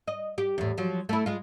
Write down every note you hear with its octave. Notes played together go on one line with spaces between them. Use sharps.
D#5
G4
E2 A2
F3 F#3
A3 E4
G#3 F4